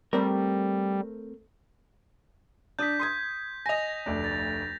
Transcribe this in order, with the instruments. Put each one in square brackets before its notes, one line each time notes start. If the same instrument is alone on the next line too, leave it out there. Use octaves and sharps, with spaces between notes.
[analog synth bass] G3 [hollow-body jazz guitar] A3 C4 A#4
[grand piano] D4 D#6 [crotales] G6 B6
[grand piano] C6 D#6 G#6
[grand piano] D#5 G#5 [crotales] A#6 F7
[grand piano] F1 D2 D4
[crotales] A6